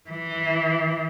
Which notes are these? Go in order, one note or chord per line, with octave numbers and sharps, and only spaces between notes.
E3